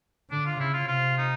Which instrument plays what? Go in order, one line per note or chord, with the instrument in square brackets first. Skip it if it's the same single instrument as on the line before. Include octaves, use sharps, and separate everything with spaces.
[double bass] D3 [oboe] D4
[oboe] F4
[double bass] C#3 [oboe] E4
[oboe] F4
[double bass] C3 [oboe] F4
[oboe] D#4